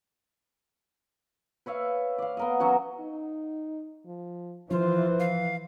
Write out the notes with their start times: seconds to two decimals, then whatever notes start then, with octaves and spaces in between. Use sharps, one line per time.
1.66 B4 C#5 E5 F5
2.18 D5 F5
2.37 B3 A#4 D#5
2.60 F#3 C#4 F#4
3.00 D#4
4.06 F3
4.71 E3 F3 F4 C5
5.20 F5